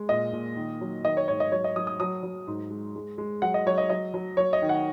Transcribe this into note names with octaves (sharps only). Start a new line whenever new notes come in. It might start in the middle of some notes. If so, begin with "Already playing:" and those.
Already playing: G#3
A#2 D#5
A#2
D#3
F#3
D#3 D#5
C#5
G#2 C#5
D#5
F#3 C#5
D#5
F#3 D#6
D#6
F#3 D#6
F#3
G#2
G#3
G#3
G#3
F#3 F#5
D#5
F#3 C#5
D#5
F#3 D#5
F#3
F#3 C#5
D#5
D#3
F#5